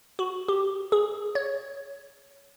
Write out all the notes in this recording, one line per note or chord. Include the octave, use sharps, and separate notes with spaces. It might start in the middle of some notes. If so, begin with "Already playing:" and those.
F#4
G4
G#4
C#5